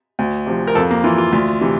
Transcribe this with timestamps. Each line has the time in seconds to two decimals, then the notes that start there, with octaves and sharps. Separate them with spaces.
0.19 D2
0.47 C3 F3
0.67 A#4
0.75 F2 A4
0.91 A#3
1.04 E3 F4
1.18 F4
1.32 D2
1.61 C3 E3